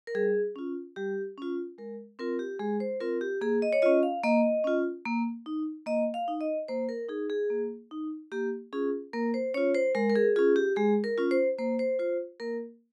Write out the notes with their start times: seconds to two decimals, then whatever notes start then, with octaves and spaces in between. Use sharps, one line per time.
0.07 A#4
0.15 G3 G#4
0.56 C#4 F4
0.96 G3 G4
1.38 C#4 F4
1.78 G#3 A#4
2.19 C4 F4 A#4
2.39 G4
2.59 G#3 G#4
2.80 C5
3.00 C4 F4 A#4
3.21 G4
3.41 A#3 G#4
3.62 D#5
3.73 C#5
3.82 C#4 F4 D#5
4.03 F5
4.23 A#3 D#5
4.64 C#4 F4
5.05 A#3
5.46 D#4
5.86 A#3 D#5
6.14 F5
6.28 D#4
6.41 D#5
6.68 A#3 C5
6.89 A#4
7.09 D#4 G#4
7.30 G#4
7.50 A#3
7.91 D#4
8.32 A#3 G4
8.73 C#4 F4 G#4
9.13 A#3 A#4
9.34 C5
9.54 C#4 C#5
9.57 F4
9.75 C5
9.95 G#3 A#4
10.10 A#4
10.16 G#4
10.36 C#4 F4 G#4
10.56 G4
10.76 G#3 G#4
11.04 A#4
11.18 C#4 F4
11.31 C5
11.58 A#3 C5
11.79 C5
11.99 F4 C5
12.40 A#3 A#4